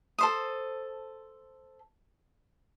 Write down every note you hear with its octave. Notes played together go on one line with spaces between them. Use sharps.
A4 C5 D#6